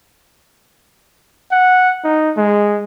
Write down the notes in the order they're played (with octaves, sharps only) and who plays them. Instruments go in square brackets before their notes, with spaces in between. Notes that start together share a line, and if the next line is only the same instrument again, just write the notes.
[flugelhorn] F#5
D#4
G#3